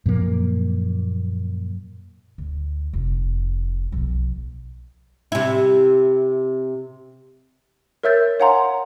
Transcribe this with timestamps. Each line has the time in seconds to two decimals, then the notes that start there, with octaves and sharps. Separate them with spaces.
0.06 F#2 A#2 F3 A#3
2.38 D2
2.93 F1
3.92 B1 F3
5.32 C3 E4
8.03 A#4 C#5 E5 E6 G6 A6
8.40 C#5 F5 F#5 G#5 A#5 C6